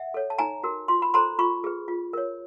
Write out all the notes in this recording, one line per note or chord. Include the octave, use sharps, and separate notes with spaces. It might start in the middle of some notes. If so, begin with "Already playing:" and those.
Already playing: E5 F#5
A4 C#5
A5
D#4 G#5 A#5
F#4 A#4
F4 C6
B5
A4 C5 A#5 C6
F4 B5 C#6
G#4 B4
F4
A#4 C#5